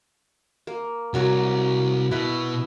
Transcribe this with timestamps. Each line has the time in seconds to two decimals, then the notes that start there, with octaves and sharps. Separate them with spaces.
0.67 A#3
1.14 C2 F#3 A#3 F#4
2.11 B2 E4 B4